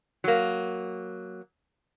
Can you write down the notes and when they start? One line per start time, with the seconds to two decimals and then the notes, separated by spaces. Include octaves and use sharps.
0.24 F#3 A#3